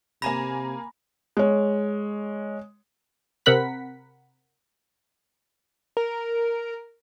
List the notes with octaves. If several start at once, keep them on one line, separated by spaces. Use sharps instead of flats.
C3 A#3 G#5 A#5 B5 A#6
G#3 C#5
C3 C4 A#4 F#5 B5 B6
A#4